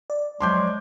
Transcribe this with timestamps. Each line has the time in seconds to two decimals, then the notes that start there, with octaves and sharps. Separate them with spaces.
0.10 D5
0.40 F3 F#3 G#3 C6 D6 G6